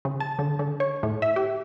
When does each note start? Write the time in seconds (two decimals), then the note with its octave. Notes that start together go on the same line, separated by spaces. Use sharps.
0.05 C#3
0.20 A5
0.39 D3
0.59 D3
0.80 C#5
1.03 A2
1.22 E5
1.36 G4